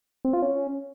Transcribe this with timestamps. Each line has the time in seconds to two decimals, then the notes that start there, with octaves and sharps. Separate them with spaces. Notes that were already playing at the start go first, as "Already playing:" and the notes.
0.25 C4
0.33 F4
0.42 C#4